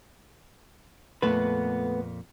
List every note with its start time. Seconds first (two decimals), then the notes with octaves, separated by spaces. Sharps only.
1.22 F2 A#2 A3 B3 B4